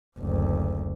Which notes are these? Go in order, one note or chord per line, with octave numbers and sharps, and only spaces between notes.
F#1 D2